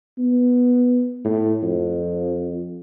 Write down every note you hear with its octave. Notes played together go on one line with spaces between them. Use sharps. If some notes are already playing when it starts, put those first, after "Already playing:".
B3
A2
F2